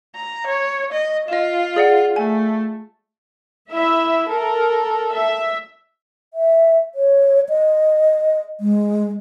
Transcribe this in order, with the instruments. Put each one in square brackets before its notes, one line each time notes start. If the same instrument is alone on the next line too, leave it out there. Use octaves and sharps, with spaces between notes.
[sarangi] A#5
C#5
D#5
[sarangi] F4 [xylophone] D#5 E7
[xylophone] G#4 D5 F#5
[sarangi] A3 [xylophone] G#5
[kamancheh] E4 [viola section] E5
[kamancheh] A4 [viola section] A#4
[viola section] E5
[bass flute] E5
C#5
D#5
G#3